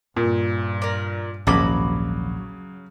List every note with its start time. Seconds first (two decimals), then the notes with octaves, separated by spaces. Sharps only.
0.16 G2 A#2
0.82 A#4 D5
1.47 A#1 D#2 G#2 C#3 F#3 F#4 B5 D6